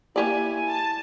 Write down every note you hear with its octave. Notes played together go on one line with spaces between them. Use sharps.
A#3 E4 G4 D5 G#5
A5